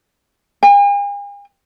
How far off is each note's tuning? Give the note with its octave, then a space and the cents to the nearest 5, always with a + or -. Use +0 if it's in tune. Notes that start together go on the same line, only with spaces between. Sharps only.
G#5 -45